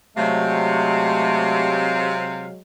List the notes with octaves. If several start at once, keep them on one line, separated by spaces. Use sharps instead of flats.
C3 F#3 G#3 A3 F5